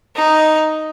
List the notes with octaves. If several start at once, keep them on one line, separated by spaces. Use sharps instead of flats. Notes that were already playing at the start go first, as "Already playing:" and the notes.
D#4